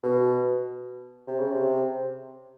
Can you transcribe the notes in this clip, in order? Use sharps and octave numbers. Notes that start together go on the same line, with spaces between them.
B2
C3
C#3
C3